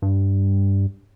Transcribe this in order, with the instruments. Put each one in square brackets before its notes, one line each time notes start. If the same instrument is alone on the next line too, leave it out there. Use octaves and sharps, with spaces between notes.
[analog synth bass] G2